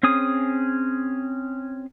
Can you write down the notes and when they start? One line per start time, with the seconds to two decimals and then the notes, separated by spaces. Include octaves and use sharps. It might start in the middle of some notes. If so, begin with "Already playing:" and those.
0.03 C4 C#4 G#4 D#6